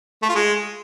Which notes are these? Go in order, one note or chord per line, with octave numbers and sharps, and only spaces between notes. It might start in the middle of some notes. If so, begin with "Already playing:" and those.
A3
F4
G#3